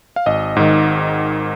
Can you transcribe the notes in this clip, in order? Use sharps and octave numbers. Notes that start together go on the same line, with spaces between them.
F5
G#1 D#5
G#2 D#3